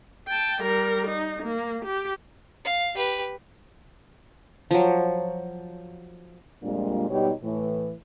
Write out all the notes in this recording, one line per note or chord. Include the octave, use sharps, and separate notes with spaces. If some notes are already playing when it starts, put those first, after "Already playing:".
G5 A5
G3 A#4
D#4
A#3
G4
F5
G4 B4
F3 F#3
F2 A#2 G3 G#3 A#3 D4
G#2 B2 G3 D#4 G4 C#5
A2 E3